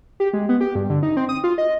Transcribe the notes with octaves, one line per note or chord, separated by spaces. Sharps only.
G4
G#3
B3
G4
G2
D3
D#4
C4
D#6
F4
D#5